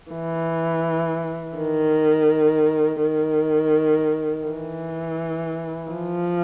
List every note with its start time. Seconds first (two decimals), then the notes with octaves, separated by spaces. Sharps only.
0.12 E3
1.58 D#3
3.02 D#3
4.47 E3
5.92 F3